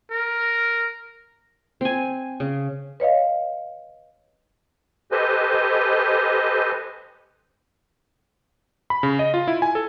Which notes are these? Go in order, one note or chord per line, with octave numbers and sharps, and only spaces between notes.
A#4
C4 G#5
C#3
B4 C#5 D#5 F5
G4 A4 B4 C5 D#5 G#5
B5
C#3
D#5
F4
E4
G#5
A4